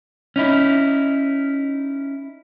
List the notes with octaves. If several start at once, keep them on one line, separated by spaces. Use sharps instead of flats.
C#4 D#4 E4